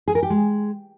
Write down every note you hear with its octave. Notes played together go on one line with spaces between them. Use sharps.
G#4
A#4
G4
G#3